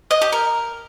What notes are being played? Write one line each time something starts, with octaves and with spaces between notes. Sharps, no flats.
D#5
G4
A#4